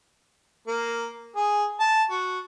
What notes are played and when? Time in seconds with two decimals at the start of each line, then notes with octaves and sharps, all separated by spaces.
0.68 A#3
1.36 G#4
1.80 A5
2.10 F#4